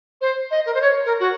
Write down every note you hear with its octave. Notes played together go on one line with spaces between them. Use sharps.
C5
D#5
A#4
C5
C#5
A#4
F#4